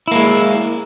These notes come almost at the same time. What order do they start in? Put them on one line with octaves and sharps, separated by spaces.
E4 A#3 G#3